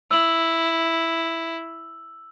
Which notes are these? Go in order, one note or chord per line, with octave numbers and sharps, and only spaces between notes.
E4 E6 F#7